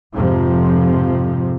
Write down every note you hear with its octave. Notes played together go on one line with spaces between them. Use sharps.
F2 G#2 C3 F3